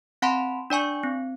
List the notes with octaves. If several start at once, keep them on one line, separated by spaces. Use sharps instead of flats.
C4 F#5 A5 B5 C6
D4 D5 G#5 C#6
C4